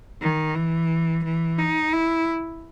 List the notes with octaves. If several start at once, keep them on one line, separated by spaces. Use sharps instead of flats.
D#3
E3
E3
D#4
E4